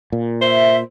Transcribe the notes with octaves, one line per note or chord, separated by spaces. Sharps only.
A#2
C5 E5